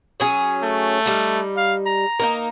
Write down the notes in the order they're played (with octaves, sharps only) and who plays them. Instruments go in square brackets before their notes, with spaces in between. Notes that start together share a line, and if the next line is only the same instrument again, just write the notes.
[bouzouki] F#3 C#4 G#4
[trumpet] A3
[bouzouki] G3 D#4
[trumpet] F5
A#5
[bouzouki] A#3 D#4 A#4